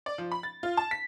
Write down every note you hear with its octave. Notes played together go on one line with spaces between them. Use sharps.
D5
F3
B5
A6
F4
A5
B6